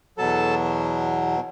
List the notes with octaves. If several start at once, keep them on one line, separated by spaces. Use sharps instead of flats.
E2 B2 F#3 A4 A5